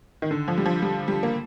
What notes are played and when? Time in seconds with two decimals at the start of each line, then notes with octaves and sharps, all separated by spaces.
0.22 D#3
0.31 D3
0.48 F3
0.57 G3
0.66 F3
0.82 G3
1.08 G3
1.23 A#3